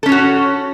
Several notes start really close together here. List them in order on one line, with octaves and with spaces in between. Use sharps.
A4 C#4 C#5 F#4